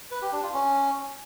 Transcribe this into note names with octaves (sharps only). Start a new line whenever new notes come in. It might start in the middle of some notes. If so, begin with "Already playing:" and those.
B4
G4
D4
F4
C#4